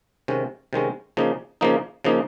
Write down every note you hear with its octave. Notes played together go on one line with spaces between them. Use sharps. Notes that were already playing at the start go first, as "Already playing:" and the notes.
C3 D#3 G#3 C#4
C3 D#3 G#3 C#4
C#3 F3 A#3 D#4
C#3 F3 A#3 D#4
C#3 F3 A#3 D#4